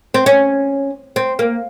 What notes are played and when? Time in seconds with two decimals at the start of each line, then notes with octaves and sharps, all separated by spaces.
0.14 C4
0.26 C#4
1.16 C4
1.39 A#3